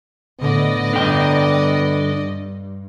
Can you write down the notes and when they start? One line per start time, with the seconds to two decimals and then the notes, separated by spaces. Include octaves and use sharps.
0.40 A2 D3 B3 D5 D#5
0.93 G2 D3 G5